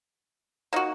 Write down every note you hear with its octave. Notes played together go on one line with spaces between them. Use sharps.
A#3 D#4 F#4